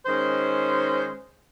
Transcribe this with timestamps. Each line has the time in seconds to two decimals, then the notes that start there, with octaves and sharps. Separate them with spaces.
0.06 D#3 G#3 C#4 C5